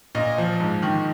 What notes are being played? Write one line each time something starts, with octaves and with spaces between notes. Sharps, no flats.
A#2 D#5
F3
G#2
D#3